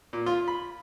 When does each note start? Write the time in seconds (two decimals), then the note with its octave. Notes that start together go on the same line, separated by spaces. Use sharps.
0.13 A#2
0.26 F4
0.48 B5